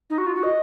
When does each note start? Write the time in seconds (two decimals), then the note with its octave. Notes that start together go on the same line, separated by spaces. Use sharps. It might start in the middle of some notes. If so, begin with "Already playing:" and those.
0.10 D#4
0.18 F#4
0.26 F4
0.35 F#4
0.43 D#5